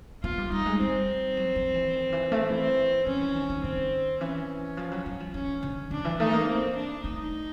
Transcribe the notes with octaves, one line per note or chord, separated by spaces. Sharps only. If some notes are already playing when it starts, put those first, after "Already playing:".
B3 F4
G3
G3 D#4
G#3
G3 C4
F#3
F3
E3
D#3
E3
A3
E3 C4
F3 C#4
E3
D#3
D#3
D#3 C4
E3 C#4
F3
F#3
F#3
F3
E3 C#4
D3
D3 D4
E3
A3 D#4
A#3
C4
D4
A3 D#4